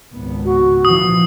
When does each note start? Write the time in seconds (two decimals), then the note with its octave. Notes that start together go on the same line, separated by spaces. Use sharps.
0.12 G#1 C#2 B3
0.45 F#4
0.85 A#2 E3 F3 D#6